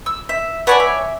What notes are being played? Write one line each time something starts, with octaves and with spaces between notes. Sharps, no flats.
E6
E5
B4 C#5 D5 F#5 G#5 A5
E5